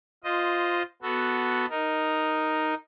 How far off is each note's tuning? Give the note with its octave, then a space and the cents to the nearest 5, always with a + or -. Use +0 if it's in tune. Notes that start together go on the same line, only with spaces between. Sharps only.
F4 +0 C5 -10 D#5 +0
B3 +0 F#4 +0 A4 +0
D#4 +0 A#4 +0